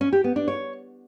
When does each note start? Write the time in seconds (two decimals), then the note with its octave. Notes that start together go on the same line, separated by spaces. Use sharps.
0.01 C#4
0.13 G4
0.24 B3
0.36 D4
0.48 C#5